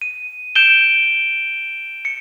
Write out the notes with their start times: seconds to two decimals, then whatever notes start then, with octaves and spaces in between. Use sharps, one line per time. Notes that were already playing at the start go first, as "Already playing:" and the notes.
0.01 D#7
0.55 G6 D7 E7 G7
2.05 C#7